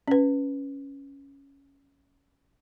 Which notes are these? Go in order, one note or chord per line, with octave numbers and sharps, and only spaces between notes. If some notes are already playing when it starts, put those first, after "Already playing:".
C#4 B4